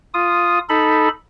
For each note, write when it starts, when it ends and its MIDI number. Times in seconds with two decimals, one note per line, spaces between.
0.14 0.59 65
0.14 0.59 87
0.69 1.08 63
0.69 1.08 69
0.69 1.08 83